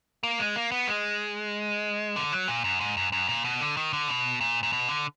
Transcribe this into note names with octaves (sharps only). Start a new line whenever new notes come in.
A#3
G#3
A#3
B3
G#3
D3
F#3
A#2
F#2
G#2
F#2
F#2
A#2
B2
D3
D#3
D3
B2
A#2
A#2
B2
D3